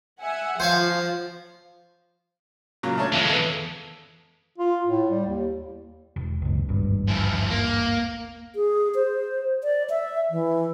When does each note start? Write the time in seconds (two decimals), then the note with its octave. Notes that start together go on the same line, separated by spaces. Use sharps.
0.21 E5 F#5 G#5
0.60 F3 C5 C#5 F5
2.83 A#2 C#3 F#3
2.97 A3 D4 C#5
3.14 F2 E3 G#3 E5
3.29 B3 A4
4.58 F4
4.86 A2
5.10 G3
5.27 D#2
6.16 E1
6.42 F#1 C#2
6.69 D#1 G#1 G2
7.08 E3 F3
7.50 A#3
8.56 G#4
8.95 C5
9.64 D5
9.90 E5
10.30 E3